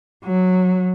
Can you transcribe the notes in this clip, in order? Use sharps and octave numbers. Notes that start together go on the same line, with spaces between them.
F#3